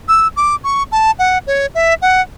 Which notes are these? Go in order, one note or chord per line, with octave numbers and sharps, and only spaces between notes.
E6
D6
C#6
A5
F#5
C#5
E5
F#5